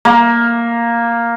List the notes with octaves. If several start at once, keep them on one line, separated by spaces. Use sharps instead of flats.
A#3